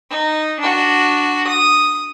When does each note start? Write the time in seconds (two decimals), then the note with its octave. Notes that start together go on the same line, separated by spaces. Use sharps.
0.11 D#4
0.60 D4 F#4
1.47 D#6